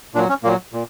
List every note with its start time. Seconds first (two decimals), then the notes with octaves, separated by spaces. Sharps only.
0.14 A#2 D4
0.18 F#3
0.29 C#4
0.44 A#2 F#3 A#3
0.73 A#2